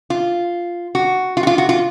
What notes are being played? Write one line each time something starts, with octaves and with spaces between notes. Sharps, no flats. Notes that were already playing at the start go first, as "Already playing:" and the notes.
F4
F#4
F4
F#4
F4
F#4
F4